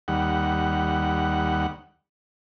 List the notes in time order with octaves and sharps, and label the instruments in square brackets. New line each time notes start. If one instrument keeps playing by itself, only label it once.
[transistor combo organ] D#2 G3 F#5